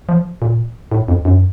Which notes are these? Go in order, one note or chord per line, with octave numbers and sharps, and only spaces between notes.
F3
A#2
A2
F2
F#2